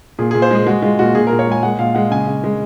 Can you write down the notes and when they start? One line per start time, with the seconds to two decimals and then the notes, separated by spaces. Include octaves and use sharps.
0.19 A#2 G#4
0.31 G#4
0.35 A#2
0.42 C5
0.51 G#3 G#4
0.67 G#3 F#4
0.82 G#3 F4
0.99 A#2 F#4
1.15 A#2 G#4
1.27 A#4
1.32 A#2
1.39 C#5
1.47 G#3 G#5
1.63 G#3 F#5
1.79 A#2 F5
1.95 G#3 F#5
2.11 C#3 G#5
2.27 C#3
2.44 G#3